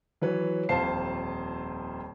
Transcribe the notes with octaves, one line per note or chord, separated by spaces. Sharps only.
E3 F#3 B4 C#5
D#1 F2 C5 F5 A5 C7